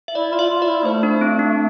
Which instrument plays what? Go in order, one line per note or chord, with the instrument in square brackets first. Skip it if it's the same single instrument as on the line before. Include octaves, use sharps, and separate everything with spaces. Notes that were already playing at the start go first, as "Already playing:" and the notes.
[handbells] E5
[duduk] E4 [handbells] D5
[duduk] F4 [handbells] D5
[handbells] E5
[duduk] F4
[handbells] D5
[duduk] E4
[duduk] A3 [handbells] C5
[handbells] D4
C4
D4